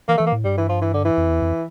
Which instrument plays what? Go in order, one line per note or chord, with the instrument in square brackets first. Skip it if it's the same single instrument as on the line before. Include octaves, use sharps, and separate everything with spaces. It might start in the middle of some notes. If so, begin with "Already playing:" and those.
[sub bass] E3 [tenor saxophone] A#3
[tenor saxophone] A3
[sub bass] E3
[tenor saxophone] A#3
[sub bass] A2
[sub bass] G2 [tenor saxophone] G3
[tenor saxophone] E3
F3
E3
D3
E3
[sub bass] F2
E2
F2